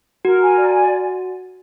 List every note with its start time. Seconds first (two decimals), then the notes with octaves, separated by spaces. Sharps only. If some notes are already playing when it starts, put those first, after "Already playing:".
0.25 F#4 A#4
0.41 G#5
0.58 D5
0.74 G#5